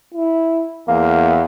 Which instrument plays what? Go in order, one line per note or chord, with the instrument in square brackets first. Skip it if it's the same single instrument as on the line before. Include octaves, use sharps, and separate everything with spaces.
[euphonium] E4
[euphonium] E2 [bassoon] A#3